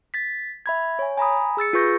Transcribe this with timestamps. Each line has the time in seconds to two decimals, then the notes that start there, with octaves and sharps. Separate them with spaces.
0.14 A6 B6
0.66 E5 B5 G#6
0.99 C#5 G#5
1.17 G#5 A#5 B5 D#6
1.57 G#4 E6 A6 C#7
1.73 F4 G#4 B4 C#6 G6 A#6